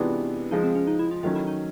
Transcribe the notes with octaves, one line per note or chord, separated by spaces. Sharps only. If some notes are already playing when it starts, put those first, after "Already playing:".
Already playing: C3 E3 G#3 B3 D4 F4
C#3 F3 G#3 D#4
C4
C#4
D#4
E4
F4
D#3 F#3 A3 C#4 F4
E4
D#4